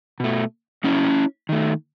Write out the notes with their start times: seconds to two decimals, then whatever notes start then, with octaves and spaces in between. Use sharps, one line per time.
0.20 B2 A3
0.84 C#3 F#3 B3 C#4 E4
1.49 D#3 A3